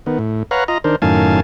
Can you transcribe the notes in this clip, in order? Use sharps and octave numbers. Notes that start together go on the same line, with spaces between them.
D#3 B3
A2
B4 C#5 F5 F#5 A#5
F4 D#5 A#5
D#3 D4 A#4 C5
F#2 A2 D#3 F5 G#5 A5